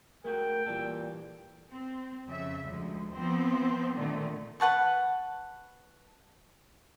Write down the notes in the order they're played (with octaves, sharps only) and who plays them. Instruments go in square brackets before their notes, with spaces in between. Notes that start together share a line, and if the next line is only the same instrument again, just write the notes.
[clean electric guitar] G#3 A3 F#4 [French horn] A#4 [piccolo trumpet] G5
[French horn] A#2 [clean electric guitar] E3 G3 A4
[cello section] C4
F2 C#3 E5
D2 F3 G#3
F3 B3 C4
A#2 D3 D#3 A3
[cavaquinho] B4 F#5 A5 C#6